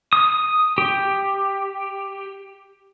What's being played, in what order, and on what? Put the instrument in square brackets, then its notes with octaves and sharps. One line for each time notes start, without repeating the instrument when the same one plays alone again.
[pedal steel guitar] D#6
G4